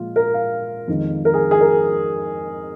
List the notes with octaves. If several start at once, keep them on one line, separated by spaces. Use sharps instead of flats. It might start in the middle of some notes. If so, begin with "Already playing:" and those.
Already playing: A#2 F3 G#3 F4
A#4
F5
F2 D#3 G#3
A#4
G#4
G#4
A#4